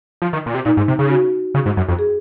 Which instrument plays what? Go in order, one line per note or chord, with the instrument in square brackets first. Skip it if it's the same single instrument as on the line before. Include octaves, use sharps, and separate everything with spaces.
[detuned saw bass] F3
D#3
A#2
C3
[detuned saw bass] A#2 [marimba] D#4
[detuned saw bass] G#2
C3
C#3
[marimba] F#4
[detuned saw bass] C#3
G#2
F#2
F2
[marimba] G#4